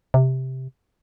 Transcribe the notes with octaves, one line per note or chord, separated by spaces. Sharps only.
C3